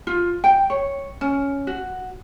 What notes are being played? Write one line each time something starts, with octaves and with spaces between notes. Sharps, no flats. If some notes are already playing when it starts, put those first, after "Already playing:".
F4
G5
C#5
C#4
F#4